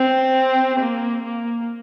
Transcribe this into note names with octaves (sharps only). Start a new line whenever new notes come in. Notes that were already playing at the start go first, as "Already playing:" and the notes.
Already playing: C4
A#3
A#3